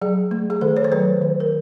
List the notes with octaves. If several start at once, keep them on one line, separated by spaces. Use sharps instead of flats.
F#3 G#4
A3
G#4
D#3 A4
C#5
C5
F#3 B4
D#3
A#4